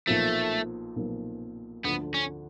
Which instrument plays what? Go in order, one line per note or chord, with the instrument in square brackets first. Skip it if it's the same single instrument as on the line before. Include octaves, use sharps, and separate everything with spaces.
[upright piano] B1 A#2 F3 [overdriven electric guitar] A3
[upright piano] B1 A#2 F3
[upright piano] D2 D3 F3 [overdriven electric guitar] B3
[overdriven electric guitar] C#4